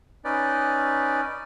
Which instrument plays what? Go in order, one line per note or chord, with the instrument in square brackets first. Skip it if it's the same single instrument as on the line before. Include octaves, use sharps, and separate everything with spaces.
[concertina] C#4 D#4 B4 D5